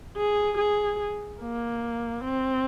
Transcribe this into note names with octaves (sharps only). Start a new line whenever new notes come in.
G#4
G#4
A#3
C4